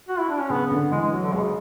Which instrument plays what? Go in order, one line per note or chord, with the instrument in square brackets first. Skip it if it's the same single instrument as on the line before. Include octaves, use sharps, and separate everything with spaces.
[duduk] F#4
E4
D4
C#4
[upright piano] C#3 [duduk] B3
[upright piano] C#3
D3
[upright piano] E3 [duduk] G#3
[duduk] G#3
[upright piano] F#3
[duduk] D3
[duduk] B2 [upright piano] G#3
[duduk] C#3